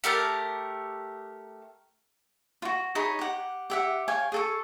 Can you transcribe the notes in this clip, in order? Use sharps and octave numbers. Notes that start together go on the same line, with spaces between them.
A3 G4 A#4 A5
F4 F#4
D#4 G#4 C#5 B5
G4 F#5
G4 E5 F#5
C#5 F5 G5 G#5
G#4 A4 C#6